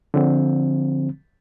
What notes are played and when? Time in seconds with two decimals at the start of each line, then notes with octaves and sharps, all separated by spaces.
0.14 D3 F3 C4